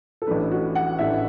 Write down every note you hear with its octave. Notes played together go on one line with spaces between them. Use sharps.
A4
A1 A2 E3 A3 D4 B4
F#4
F#5
A1 A2 E3 A3 D4 E5